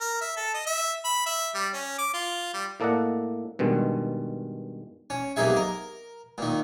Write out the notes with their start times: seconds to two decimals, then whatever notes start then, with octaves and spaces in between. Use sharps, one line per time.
0.01 A#4
0.21 E5
0.37 A4
0.54 D#5
0.67 E5
1.05 B5
1.26 E5
1.55 G3
1.74 C#4
1.98 D6
2.14 F4
2.54 G3
2.80 A2 A#3 A4 D5 D#5 F#5
3.59 G2 B2 D#3 G#3
5.10 C#4
5.36 B1 C3 A#3 D#4 G#4 E5
5.56 A#4
6.38 A#2 D#3